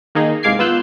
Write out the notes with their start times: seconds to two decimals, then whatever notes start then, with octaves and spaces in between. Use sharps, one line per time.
0.15 D#3 A#3 D#4 G#4
0.43 C2 G#2 F5 D6 G#6 C7
0.59 B3 F4 E6 F#6 G6